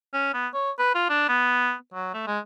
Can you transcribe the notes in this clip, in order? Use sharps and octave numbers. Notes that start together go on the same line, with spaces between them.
C#4
B3
C#5
B4
F4
D4
B3
F#3
A3
G#3